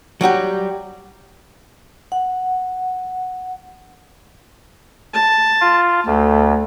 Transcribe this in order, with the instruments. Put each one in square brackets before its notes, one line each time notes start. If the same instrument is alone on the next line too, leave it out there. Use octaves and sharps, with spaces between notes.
[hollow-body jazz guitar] F#3 G3 F#4 G4
[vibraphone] F#5
[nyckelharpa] A5
[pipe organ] F4
[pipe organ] D2 [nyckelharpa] A3